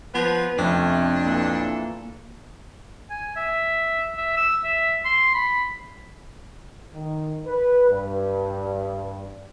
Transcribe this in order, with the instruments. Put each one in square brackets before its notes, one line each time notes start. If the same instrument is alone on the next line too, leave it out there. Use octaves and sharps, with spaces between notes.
[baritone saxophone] F3 [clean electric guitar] B3 [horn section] B4
[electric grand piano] F2 [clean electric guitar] C3 [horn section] A3 C#4 [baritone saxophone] D4
[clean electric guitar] A#2 [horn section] E3 A4
[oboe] G#5
E5
E5
E6
E5
C6
B5
[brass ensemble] D#3
B4
G2